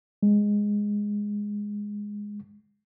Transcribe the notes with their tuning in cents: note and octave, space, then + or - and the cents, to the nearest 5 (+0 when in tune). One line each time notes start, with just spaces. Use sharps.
G#3 -10